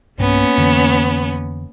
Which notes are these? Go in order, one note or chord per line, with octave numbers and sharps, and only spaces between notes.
B1 G2 A#3 B3 C#4
F2 D3 E3